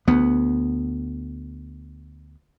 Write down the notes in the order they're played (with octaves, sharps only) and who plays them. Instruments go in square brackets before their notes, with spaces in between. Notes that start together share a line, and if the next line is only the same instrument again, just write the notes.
[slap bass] D2 B3